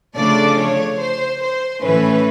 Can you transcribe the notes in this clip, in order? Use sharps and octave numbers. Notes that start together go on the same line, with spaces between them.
C#3 F3 A3 D4 D5
C#5
C5
C5
A2 E3 A3 C#4 B4